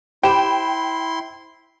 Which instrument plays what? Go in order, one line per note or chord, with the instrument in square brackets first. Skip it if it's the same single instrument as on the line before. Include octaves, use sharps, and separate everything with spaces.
[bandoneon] E4 C6 [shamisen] G4 [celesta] C5 B5 E7 [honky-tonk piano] G5